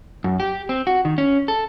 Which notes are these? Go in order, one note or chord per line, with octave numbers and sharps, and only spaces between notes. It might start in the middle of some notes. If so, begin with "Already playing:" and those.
F#2
G4
C4
F#4
D#3
C#4
A4